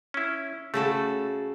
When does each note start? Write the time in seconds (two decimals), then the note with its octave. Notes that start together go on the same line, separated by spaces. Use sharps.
0.14 C#4 E4
0.74 C#3 A3 F#4 A4